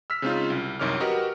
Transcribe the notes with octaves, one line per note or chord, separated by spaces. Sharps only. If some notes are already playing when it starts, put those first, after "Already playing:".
E6 F6 B6
C#3 G#3 C4 C#4 D#4 F4
C2
C2 F#2 D#3 C#5 D6 F6
F#4 G4 A#4 B4 D#5 F#5